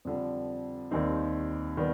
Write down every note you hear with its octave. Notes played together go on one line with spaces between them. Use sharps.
F2 D3 G3
D#2 D#3 G3 C4 D#4
D#3 G3 B3